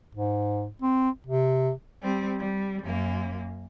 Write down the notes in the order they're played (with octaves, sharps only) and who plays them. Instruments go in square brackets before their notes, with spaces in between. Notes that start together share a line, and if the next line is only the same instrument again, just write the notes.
[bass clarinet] G#2
C4
C3
[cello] G3 C4
G3
F#2 A#3